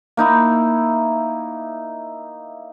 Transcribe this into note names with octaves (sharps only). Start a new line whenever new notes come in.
A#3 D#4 E4